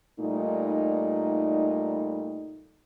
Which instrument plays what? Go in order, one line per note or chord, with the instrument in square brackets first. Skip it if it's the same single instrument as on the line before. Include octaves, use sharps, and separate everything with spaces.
[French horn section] A#2 G3 A3 D#4